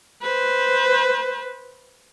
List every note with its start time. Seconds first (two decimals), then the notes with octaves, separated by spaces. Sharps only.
0.22 B4 C5